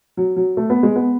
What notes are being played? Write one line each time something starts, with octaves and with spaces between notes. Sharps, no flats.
F#3
F#3
A3
B3
G#3
B3